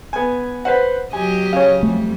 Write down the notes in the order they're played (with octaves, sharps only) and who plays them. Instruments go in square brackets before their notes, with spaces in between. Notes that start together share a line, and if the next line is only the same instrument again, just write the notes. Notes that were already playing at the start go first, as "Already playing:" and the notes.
[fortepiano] B3 G#5
B4 C5 F#5
[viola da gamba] F#3 G4 D#5 [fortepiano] G#5
[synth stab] C#3 C#4
[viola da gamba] F2 G3 [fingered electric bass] A3